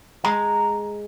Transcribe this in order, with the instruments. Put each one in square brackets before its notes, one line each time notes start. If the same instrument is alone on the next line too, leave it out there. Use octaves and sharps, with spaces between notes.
[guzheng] G#3 [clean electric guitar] A#5